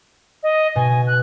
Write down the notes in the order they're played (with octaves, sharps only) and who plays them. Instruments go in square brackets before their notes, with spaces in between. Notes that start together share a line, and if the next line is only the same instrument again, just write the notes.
[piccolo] D#5
[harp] B2 [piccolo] G#5
[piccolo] F#6